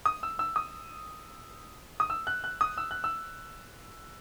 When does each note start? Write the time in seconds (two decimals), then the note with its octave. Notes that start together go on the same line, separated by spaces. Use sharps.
0.06 D#6
0.23 E6
0.39 E6
0.56 D#6
2.00 D#6
2.10 E6
2.27 F#6
2.44 F#6
2.61 D#6
2.78 E6
2.91 F#6
3.04 E6